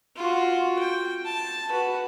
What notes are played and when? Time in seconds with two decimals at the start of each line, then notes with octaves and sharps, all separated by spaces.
0.16 F4 F#4
0.79 G5
1.25 A5
1.71 F#4 B4